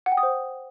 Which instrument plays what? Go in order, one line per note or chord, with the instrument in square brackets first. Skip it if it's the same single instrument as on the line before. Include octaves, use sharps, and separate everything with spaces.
[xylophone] F#5
G5
D#6
C5